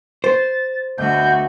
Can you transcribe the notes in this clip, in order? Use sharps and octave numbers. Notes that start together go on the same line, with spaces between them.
C5 A6
D2 B2 F#4 E5 G6